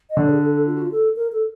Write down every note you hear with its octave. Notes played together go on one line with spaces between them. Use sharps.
D#5
D3 D5
G#4
A4
A4
F4
F#4
F4
A4
A#4
A4